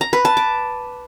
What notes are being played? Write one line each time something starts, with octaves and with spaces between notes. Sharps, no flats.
A#5
B4
A5
D6